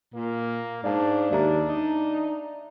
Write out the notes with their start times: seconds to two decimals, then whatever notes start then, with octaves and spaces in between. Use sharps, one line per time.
0.14 A#2 A#3
0.84 G#2 D4 D5 F5 A5
1.31 D#2 D5 E5 A#5
1.69 D#4